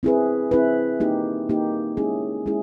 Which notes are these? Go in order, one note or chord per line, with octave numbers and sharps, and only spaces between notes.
C4 E4 G#4 B4
C4 E4 G#4 B4
A#3 D#4 G4
A#3 D#4 G4
G#3 C#4 E4 G#4
G#3 C#4 E4 G#4